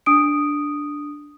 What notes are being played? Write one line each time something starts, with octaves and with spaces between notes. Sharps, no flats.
D4 D#6 D7